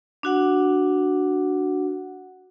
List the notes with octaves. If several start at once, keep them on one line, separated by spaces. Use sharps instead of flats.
D4 F#4 F#5